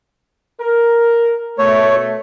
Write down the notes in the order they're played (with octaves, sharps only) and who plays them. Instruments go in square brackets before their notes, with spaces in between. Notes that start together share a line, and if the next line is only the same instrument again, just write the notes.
[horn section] A#4
[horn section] B2 A3 [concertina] C#5